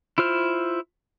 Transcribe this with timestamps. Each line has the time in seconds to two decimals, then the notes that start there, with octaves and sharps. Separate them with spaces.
0.18 E4 F4 C5 F6